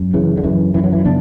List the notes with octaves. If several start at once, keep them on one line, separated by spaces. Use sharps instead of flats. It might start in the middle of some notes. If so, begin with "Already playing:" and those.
Already playing: F#2
C#3 E3
D3
F#2 E3
F#2 E3
F#3
E3
C#3 B3 D4